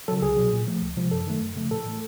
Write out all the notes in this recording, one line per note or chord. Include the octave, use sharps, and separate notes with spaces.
C#3 F#3 A4
C2 G#4
B2 F#3
A#2
F3 A3
C#2
C3 F3 G#3
F#2 A4
D#3 F#3 A3
F#2
C#3 F3 A3
A2 A4
E3 A3